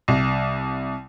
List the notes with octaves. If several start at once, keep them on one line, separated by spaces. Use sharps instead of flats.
C2